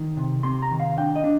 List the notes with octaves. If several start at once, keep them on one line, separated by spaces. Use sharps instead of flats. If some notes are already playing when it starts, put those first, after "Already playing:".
Already playing: D#3
C3
C3 C6
A#5
D#3
F5
D4 G5
D#5
D4